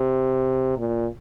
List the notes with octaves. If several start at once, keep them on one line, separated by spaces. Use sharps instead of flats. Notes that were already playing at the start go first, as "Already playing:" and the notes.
Already playing: C3
A#2